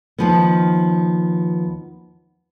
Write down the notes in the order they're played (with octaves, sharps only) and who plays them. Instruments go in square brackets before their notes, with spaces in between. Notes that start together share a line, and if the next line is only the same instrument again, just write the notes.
[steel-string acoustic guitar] D#2 F3 B3